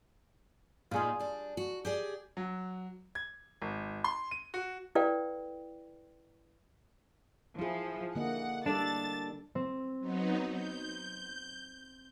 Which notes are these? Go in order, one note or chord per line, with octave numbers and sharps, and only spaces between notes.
A#2 G3 D#4 F4 G#4
G3 D4
F#4
G4 G#4 D5
F#3
G#6
G#1
C6
D#7
F#4
E4 A4 B4 D5 F5 G5
F3 E4 G#4
D3 A#3 D#5 F#5
G3 D4 A4 D5 A6
C4
F#3 B3 D#4
G6